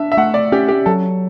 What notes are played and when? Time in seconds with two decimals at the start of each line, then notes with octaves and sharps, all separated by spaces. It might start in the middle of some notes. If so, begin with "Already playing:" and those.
Already playing: D4 E5
0.12 E5
0.17 A3 F#5
0.34 D5
0.52 C#4 G4
0.68 G4
0.86 F#3 A4